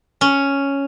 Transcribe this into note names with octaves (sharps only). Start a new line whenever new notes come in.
C#4